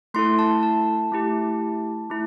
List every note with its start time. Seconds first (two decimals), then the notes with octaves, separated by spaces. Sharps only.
0.14 A3 E4 A4 C6
0.39 A5
0.63 A5
1.12 A3 E4 G4
2.10 A3 E4